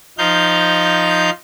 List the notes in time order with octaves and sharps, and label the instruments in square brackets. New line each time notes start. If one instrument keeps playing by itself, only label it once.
[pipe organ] F3 D#4 F5 G6